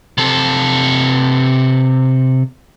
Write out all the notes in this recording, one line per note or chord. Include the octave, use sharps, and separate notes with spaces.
C3 A4